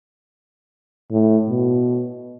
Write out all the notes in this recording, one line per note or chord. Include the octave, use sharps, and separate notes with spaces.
A2
B2